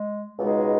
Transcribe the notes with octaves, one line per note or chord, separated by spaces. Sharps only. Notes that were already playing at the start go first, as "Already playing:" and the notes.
Already playing: G#3
C#2 B2 G#3 D#4 G#4